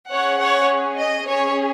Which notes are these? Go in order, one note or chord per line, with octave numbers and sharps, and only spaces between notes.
C#4 G#4 C#5 F#5
C#5 F#5
D#5
C#4 G#4 C#5